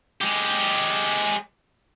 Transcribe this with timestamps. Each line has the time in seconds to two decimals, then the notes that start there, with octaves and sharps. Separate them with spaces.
0.22 G#3 G4